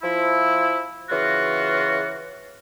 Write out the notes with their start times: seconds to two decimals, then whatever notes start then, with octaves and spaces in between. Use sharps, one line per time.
0.03 F3 E4
1.10 C#3 E3 F4 F#4